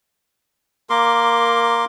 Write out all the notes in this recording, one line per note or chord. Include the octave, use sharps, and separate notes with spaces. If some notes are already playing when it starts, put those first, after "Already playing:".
A#3 A#4 C6 D6